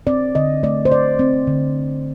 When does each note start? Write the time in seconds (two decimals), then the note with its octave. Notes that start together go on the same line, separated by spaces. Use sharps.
0.07 C4 D5
0.35 D3 D#5
0.63 A3 D5
0.85 C5
0.91 D3 D5
1.19 C4
1.47 D3